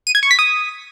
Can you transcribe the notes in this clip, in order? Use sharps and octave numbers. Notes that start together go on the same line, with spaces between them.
D#7
G#6
C#6
B6
D#6